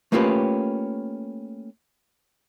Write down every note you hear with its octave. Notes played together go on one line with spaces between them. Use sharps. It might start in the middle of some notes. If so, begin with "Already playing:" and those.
A3 A#3 C#4 F4 G4 B4